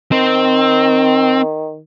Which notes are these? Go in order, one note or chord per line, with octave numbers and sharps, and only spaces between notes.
D#3 C4